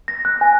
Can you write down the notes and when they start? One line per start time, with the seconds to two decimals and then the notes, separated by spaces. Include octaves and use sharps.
0.08 A#6
0.25 F#6
0.41 G#5